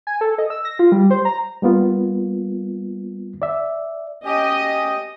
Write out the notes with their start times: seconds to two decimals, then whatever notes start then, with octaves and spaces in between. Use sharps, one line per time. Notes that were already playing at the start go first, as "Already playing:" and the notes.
0.07 G#5
0.21 A4
0.38 D#5
0.50 E6
0.65 A#6
0.79 F4
0.92 G3
1.11 C5
1.25 A#5
1.62 G3 A#3 B3 F4
3.42 D5 E5
4.25 C#4 G4 D#5